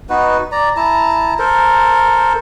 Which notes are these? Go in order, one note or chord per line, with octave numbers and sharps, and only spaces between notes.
B3 D#4 F#4 B4
D5 A#5
E4 A5 A#5
A4 A#4 C5